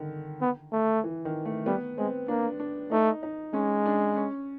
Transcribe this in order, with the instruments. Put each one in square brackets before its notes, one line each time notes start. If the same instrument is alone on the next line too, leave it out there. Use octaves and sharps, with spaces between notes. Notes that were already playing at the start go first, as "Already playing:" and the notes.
Already playing: [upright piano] D3 D#3
[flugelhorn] B3
A3
[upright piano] E3
D#3
A3
[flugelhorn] G3 [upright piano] B3
[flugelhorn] G#3 [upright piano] C4
[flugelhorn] A#3 [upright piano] D4
[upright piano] D4
[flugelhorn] A3 [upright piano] D#4
[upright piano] D#4
[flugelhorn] G#3 [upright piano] C#4
[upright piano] D4
C#4